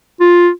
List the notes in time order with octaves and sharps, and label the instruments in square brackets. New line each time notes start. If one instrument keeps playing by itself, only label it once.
[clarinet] F4